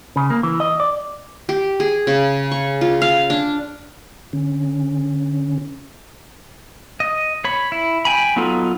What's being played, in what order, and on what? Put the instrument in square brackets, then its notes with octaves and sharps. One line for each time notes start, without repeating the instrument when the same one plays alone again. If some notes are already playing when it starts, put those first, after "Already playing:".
[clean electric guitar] C#3
A#3
E3
D#5
D5
[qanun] G4
G#4
C#3
C#6
F4
F5
D4
[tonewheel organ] D3 C#4
[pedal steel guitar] D#5
C#5 B5
E4
G5 G#5 B5
F#3 B3 D#4 F4 A4